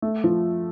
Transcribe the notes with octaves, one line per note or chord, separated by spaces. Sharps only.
A3
F3